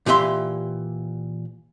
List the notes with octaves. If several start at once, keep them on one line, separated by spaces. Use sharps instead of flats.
A#2 E3 G4 E5 C6